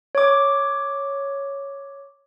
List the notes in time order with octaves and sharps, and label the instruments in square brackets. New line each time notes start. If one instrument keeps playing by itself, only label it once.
[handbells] C#5 D6